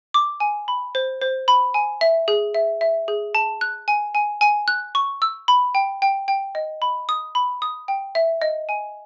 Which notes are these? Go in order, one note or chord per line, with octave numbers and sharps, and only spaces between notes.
D6
G#5
B5
C5
C5
B5
G#5
E5
G#4
E5
E5
G#4
A5
F#6
G#5
G#5
G#5
F#6
C#6
E6
B5
G5
G5
G5
D#5
B5
D#6
B5
D#6
G5
E5
D#5
G#5